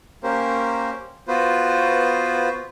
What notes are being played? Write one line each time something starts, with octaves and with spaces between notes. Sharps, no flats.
A#3 C#4 G4 A#4 C5
B3 F4 F#4 B4 C5